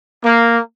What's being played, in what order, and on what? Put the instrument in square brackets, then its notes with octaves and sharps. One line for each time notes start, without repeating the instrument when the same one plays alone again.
[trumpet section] A#3